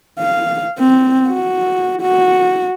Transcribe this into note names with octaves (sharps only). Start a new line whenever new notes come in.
F5
C4
F#4
F#4